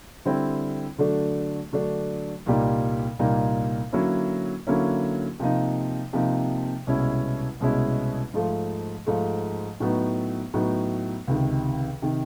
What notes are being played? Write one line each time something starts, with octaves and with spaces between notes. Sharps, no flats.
D3 G3 C4 E4
D3 F#3 A3 D4
D3 F#3 A3 D4
C2 A#2 G3 A#3 D#4
C2 A#2 G3 A#3 D#4
D3 F#3 A#3 C#4 E4
D3 F#3 A#3 C#4 E4
C3 F3 A#3 D#4
C3 F3 A#3 D#4
C2 B2 G#3 C#4 E4
C2 B2 G#3 C#4 E4
G#2 F3 A3
G#2 F3 A3
A2 F#3 B3 D#4
A2 F#3 B3 D#4
C#2 C3 D#3
C3 D#3